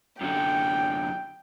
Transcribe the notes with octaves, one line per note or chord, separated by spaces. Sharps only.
F#2 D3 G5